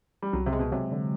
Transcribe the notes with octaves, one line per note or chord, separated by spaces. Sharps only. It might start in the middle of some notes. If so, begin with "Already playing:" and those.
G3
C2 F#3
C3
G#3
B2
C3 F#3
D3